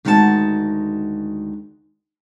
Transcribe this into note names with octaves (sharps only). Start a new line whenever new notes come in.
D2 D#3 G#3 F#4 A#4 A5